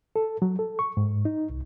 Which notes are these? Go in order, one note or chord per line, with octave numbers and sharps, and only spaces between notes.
A4
F#3
A4
C#6
G#2
D#4
C2